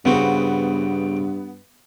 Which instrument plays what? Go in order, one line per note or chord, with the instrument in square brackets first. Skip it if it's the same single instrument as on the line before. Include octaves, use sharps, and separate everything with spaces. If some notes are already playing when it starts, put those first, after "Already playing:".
[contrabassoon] G2 [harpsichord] C#3 C4 F#4 [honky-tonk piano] B3